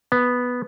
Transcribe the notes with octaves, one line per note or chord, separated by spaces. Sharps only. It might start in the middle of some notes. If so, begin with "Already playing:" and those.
B3